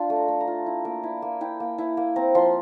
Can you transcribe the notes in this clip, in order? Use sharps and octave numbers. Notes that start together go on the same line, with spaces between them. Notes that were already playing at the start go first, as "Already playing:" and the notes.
Already playing: D4 F4 C6
A3
A#5
A3
A#5
F4
E4
A#3
E4
A#3
E4 G5
A#3
E4
A#3
C4 A#5
F3 C6